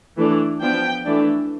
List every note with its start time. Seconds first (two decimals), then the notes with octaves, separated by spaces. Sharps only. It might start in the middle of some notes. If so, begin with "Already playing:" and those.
0.18 E3 A3 D4
0.61 F3 B3 D4 G5
1.05 E3 A3 D4